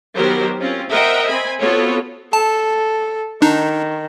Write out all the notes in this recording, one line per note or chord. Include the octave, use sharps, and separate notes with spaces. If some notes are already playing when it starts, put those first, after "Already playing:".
D#3 F#3 B3 G4 A#4 C5
C4 C#4 F4
A#4 C5 D#5 E5 F#5 G5
C4 G#5 B5
B3 C4 F4 F#4 A4 C#5
A4 A5
D#3 D4 D#4